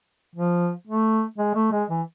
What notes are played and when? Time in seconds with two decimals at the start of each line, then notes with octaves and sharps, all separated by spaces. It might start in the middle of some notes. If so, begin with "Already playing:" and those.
0.36 F3
0.87 A3
1.38 G#3
1.55 A3
1.72 G#3
1.90 E3